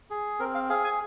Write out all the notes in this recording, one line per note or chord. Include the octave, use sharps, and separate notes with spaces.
G#4
C4 A#4
F5
G#4 F5
G#5